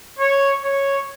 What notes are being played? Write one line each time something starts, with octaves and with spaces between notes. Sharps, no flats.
C#5
C#5